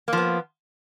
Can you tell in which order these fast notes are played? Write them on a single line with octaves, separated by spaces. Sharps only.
A#3 F3 B3